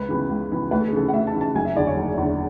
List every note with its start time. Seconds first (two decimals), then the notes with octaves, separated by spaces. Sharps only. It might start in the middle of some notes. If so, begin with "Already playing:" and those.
Already playing: C#2 B4
0.08 C#3 E3 B3
0.29 C#2
0.51 C#3 E3 B3
0.71 D2 B4
0.80 A4
0.88 G#4
0.92 C#3 E3 A4
1.08 F#5
1.13 D2 E5
1.27 A5
1.34 C#3 E3
1.41 A5
1.55 F#1 G#5
1.65 E5
1.76 E2 D3 D5
1.87 C#5
1.96 F#1
2.17 E2 D3